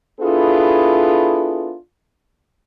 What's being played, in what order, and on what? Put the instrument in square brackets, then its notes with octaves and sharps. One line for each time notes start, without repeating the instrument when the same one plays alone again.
[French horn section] B3 D4 E4 F4 G#4 A4